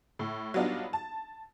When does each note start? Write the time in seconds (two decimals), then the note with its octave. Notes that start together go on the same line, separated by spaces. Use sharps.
0.19 A2
0.54 F#3 G3 B3 D4 D#4 F4
0.93 A5